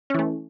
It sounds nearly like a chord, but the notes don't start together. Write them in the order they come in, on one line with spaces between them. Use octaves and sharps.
C#4 E3 A3